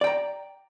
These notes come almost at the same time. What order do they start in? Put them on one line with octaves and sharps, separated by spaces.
D5 G5 A#5